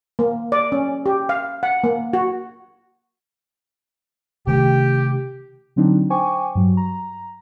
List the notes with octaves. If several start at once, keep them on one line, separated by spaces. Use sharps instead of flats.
A#3
D5
C#4
G4
F5
F#5
A#3
F#4
C3 D#3 A3 G4
D3 F#3 C4 D4 D#4
C5 G5 G#5 C#6 D6
G2 F#3
A#5